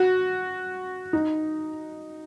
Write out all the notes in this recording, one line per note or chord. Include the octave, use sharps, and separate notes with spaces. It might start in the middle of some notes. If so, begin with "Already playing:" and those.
Already playing: F#4
D#4